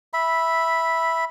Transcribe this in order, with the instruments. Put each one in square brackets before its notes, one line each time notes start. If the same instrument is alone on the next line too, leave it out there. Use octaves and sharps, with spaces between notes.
[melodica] E5 B5